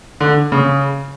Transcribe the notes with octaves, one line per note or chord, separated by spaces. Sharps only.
D3
C#3